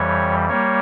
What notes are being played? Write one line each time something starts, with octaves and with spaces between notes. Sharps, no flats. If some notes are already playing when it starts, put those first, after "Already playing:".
Already playing: F2 E3 G3 C#5
G3 A#3 C#5